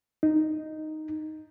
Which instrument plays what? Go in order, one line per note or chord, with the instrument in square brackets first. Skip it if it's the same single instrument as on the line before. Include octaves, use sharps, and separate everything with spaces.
[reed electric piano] D#4